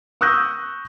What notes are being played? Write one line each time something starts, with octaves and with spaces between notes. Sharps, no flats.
C#6 D#6 E6 F#6 G6 A#6